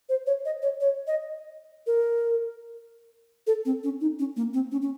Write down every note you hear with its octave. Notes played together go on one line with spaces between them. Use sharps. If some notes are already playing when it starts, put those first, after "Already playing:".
C5
C#5
D#5
C#5
C#5
D#5
A#4
A4
C4
C#4
D#4
C#4
A#3
C4
C#4
C#4